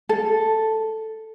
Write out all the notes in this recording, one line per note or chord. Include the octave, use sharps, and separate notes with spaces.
A4